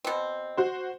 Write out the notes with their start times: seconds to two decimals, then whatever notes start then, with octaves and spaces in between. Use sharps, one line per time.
0.05 B2 C4
0.57 F#4 C5